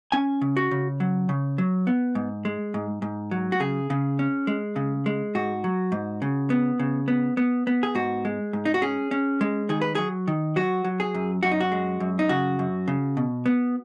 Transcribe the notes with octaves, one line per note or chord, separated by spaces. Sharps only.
C#4 G#5
C#3
F#4
C#3
F#3
C#3
F#3
B3
G#2
G#3
G#2
G#2
F#3
F#4
C#3 G#4
C#3
C#4
G#3
C#3
G#3
G#2 F#4
F#3
G#2
C#3
B3
C#3
B3
B3
B3
G#4
G#2 F#4
G#3
G#2
D#4
F#4
C#4 G#4
C#4
G#3
D#3 G#4
B4
F#3 G#4
D#3
F#3 F#4
F#3
G#4
F#2
F#2 F#4
D#4
F#4
G#3
F#2
D#4
C#3 F#4
F#2
C#3
B2
B3